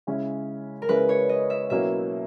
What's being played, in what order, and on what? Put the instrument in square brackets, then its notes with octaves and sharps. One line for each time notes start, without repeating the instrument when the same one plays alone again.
[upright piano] C#3 G#3 C#4 E4
[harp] A#4
[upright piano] C#3 G#3 C#4 E4 [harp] B4
[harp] C#5
D#5
E5
[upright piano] B2 F#3 A#3 C#4 E4 [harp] E5